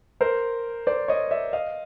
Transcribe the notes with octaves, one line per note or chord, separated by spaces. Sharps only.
A#4 C5
C5 D5
C#5 D#5
D5 E5
D#5 F5